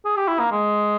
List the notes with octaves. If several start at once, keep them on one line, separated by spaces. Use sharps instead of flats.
G#4
G4
E4
A#3
G#3